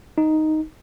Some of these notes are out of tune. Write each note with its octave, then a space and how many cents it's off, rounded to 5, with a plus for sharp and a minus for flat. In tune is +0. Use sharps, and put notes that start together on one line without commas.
D#4 +0